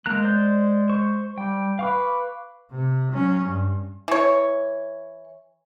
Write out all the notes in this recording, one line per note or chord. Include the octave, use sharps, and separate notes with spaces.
G#3 A#3 A#5 F#6
C5 D5 G6
C5 C#6
G3 G5
B4 F5 C#6 D6
C3
F#3 C#4
G2
E3 C#5